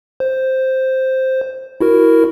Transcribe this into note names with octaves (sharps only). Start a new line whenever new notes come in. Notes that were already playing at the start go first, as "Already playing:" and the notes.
C5
E4 F#4 A#4